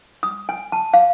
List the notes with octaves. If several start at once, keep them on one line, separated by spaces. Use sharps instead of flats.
D#6
G#5
A5
F5